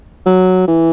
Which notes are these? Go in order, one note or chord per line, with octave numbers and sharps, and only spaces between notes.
F#3
E3